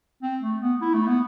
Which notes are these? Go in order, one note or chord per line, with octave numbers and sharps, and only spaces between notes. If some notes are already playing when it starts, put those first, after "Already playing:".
C4
A3
B3
E4
A3
B3